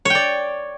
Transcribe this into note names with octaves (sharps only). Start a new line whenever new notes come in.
C#5 D5 G5